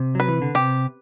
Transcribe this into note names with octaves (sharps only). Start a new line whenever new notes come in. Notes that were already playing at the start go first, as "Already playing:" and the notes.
Already playing: C3
F#3 B4
E3
D3
C3 G4